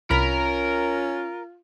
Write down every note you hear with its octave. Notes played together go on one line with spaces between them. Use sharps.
C2 C#4 F4 A#4 B5 B6